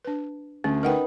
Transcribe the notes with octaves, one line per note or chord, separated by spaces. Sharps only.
D4 B4
D2 C#4
D#4 A#4 B4 F#5 G5